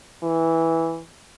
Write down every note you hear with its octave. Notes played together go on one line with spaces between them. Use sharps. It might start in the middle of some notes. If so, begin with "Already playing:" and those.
E3